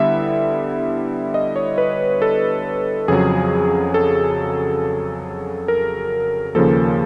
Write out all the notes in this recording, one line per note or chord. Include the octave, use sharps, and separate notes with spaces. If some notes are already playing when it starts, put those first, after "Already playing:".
Already playing: D3 G3 B3 E4 E5
D#5
C#5
B4
A4
F2 C#3 F#3 G#4
A4
A#4
D#2 C#3 F3 A#3 A4